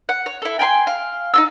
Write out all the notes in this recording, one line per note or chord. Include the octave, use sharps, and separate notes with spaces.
F#5
C#5
E4 A4
G5 G#5 B5 C6
F5
D#4 F4 E6